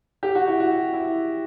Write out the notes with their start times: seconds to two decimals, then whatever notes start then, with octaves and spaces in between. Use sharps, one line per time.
0.23 G4
0.35 F#4
0.48 E4
0.60 F#4
0.93 E4